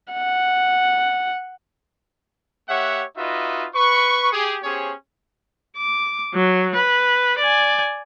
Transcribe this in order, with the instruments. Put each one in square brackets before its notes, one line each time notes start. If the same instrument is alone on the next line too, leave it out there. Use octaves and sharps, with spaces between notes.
[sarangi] F#5
[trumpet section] A#3 G4 C#5 E5 F#5
D#4 F4 F#4 B4 D#5 E5
B4 C#6
G4 G#4
B3 C#4 G4 G#4 C5 C#5
[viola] D6
F#3
B4
D5 G#5